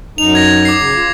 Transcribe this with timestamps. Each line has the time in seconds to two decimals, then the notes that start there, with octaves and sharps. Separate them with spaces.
0.18 F#2 D#4 F7
0.35 G#6 A#6
0.65 D6 C7
0.79 C#3
0.95 F4